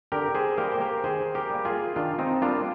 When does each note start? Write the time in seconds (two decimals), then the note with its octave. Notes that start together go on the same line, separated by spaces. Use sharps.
0.12 D3 G4 A#4
0.35 G#4 C5
0.57 G3 A#3 G4 A#4
0.71 C5
0.81 G4 A#4
1.04 D#3 G#4 C5
1.35 G4 A#4
1.50 G3 A#3
1.65 F4 G#4
1.96 D#3 D4 F4
2.19 C4 D#4
2.42 G3 A#3 D4 F4